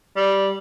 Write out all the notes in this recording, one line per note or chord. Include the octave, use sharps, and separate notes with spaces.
G3